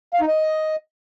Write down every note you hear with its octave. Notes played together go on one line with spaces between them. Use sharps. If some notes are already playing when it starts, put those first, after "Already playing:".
F5
D#4
D#5